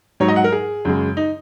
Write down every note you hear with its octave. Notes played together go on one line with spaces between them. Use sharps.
G#2 F#3 C#5
D#5
F#5
A#4
G#4
F#2 C#3 G#3
D#4